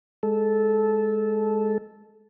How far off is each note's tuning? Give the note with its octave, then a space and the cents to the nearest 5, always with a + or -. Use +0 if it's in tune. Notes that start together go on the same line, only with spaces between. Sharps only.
G#3 +0 A4 -15